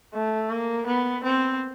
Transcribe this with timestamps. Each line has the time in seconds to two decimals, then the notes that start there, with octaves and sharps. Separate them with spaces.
0.14 A3
0.50 A#3
0.87 B3
1.24 C4